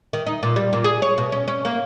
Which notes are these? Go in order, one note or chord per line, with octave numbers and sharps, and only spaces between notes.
D#3
D#4
A#2
G3
A#2
G#4
C#5
B2
C#4
C#4
A#3